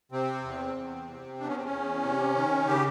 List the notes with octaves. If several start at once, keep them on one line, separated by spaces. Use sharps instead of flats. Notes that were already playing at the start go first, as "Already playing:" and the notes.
C3 C4
E2
E2
C3
E2 D4
C#4
C4
C#4
E2
C3
D#3
C#3 G4